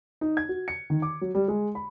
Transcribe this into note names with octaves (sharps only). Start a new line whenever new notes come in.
D#4
G#6
F#4
C#7
D#3
D6
F#3
G3
G#3
B5